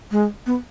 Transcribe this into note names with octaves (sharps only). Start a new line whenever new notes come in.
G#3
B3